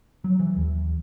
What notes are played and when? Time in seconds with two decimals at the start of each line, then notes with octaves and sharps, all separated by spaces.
0.24 F#3
0.39 E3
0.57 D#2